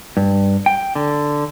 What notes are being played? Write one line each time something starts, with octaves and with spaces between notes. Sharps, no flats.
G2
G5
D3